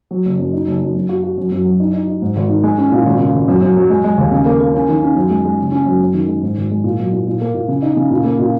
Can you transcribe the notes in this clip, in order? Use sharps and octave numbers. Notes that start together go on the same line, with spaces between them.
F#3
F#1
F#2
D#4
F#1
F#2
F#2
F#4
F#4
F#2
F#2
F#3
D#4
D#4
D#4
G#2
G#1
D#3
G#3
C#4
A#2
G#1
C#3
G#1
F#2
F#2
F#3
G#3
G#3
D#2
C#3
A#3
A#3
C#4
D#3
C#4
F#2
G#3
G#3
F#1
C#4
F#2
F#2
D#3
G#3
G#2
G#1
G#3
A#2
F#3
A#2
A#2
A#3
A#2
C#3
D#4
C#3
A#2
A#3
A#2